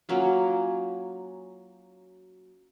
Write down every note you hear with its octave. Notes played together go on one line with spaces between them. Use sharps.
F#3 A#3 C#4 F4